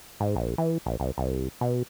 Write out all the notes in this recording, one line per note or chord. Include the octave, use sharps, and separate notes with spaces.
G#2
A#1
E3
A#1
C2
C2
B2